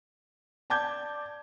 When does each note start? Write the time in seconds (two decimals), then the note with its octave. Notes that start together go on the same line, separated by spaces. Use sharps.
0.70 D5 A5 D6 G6 G#6